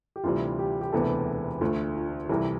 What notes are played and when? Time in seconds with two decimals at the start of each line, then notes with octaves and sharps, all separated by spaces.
0.16 G4
0.24 D2 C3 E3 G3 F4
0.59 G4
0.81 G4
0.92 E1 D2 C3 E3 B3 A4
1.61 D2 D3 A3 F4
1.96 F4
2.26 G4
2.29 C2 C3 E3 A4